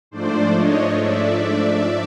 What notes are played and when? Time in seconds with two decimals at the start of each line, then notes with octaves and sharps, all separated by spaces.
0.11 G#2 F3 A3 D4 C5 D5
0.55 C#5 D#5
0.97 D5 E5